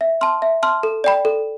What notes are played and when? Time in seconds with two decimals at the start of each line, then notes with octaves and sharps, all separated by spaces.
0.01 E5
0.21 A5 C6 F6
0.42 E5
0.63 A5 C6 F6
0.83 A4
1.04 D5 G5 B5
1.25 A4